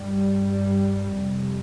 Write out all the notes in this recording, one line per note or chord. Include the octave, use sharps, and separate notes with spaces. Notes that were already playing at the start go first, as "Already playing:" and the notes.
Already playing: G2 G3
F2 C3